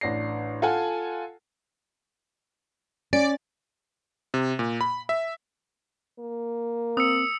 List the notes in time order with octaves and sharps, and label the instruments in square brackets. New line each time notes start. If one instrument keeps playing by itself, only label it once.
[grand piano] A1 D4 A#6 C7
F4 A4 F#5 G#5 A5
[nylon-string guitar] C#4 [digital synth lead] D5
[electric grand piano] C3
A#2
B5
E5
[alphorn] A#3
[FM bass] C4 [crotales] D#6 E6 C#7